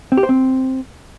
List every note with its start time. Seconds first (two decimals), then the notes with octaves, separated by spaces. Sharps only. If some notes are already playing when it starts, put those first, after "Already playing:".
0.12 C4
0.17 G4
0.23 C5
0.29 C4